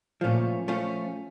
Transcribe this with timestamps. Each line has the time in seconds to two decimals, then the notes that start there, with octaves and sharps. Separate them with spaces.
0.21 A#2 F3 A3 C#4
0.68 F3 A3 C#4